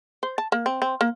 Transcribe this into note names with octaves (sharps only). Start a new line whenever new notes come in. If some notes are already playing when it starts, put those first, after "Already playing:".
C5
A5
A#3
C4
C4
A#3